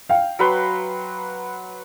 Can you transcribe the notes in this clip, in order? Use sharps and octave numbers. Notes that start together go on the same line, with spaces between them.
F5 G5
F#3 B4 C6